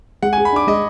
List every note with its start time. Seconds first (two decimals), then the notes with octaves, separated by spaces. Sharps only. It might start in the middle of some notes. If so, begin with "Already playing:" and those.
0.22 G#3 F#5
0.33 G#5
0.38 G#4
0.45 B5
0.53 D4 D6
0.67 G#3 D#5